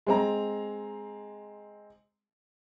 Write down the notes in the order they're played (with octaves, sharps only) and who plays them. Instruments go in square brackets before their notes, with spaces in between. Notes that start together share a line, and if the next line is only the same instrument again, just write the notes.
[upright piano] G#3 C4 A#5